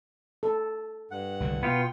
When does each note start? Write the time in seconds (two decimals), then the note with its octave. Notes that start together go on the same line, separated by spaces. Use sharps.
0.43 A4
1.11 G2 F#5
1.40 C2 D3 D#3
1.63 B2 B3 F4 G5